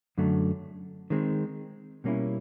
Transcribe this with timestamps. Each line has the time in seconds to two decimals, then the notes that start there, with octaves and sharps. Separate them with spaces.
0.18 F#2 D3 F#3 A3
1.10 D#3 G#3 C4
2.04 B2 G3 A#3 C#4 E4